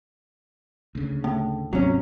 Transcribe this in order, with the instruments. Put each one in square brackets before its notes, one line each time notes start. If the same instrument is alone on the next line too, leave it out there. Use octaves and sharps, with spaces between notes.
[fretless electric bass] D2 C#3
[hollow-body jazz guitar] A2
[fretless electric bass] G#1 D#2 C3 [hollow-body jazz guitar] F#3 C#4